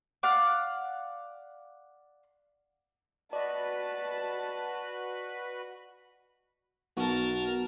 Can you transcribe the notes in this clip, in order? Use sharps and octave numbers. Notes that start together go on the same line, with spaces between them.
D5 F5 F#5 D6
F#4 B4 D5 D#5 A5 B5
B1 B3 F#4 A#4 A5